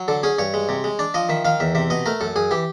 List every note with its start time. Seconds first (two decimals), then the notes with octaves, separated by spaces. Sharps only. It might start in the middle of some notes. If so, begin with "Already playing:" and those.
Already playing: F#3
0.08 D3 A4
0.23 C#4 G#4
0.39 G2 C#5
0.54 G#3
0.69 C3
0.84 G#3
0.99 D4 D5
1.14 F3 D#5
1.29 D#3 E5
1.45 D#3 F5
1.60 E2 E5
1.75 C3 E5
1.90 B2 D#5
2.06 A3 A#4
2.21 F#2 A4
2.36 F#2 G#4
2.51 E3 G4